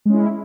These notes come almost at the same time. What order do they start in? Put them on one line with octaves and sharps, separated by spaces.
G#3 C#4 E4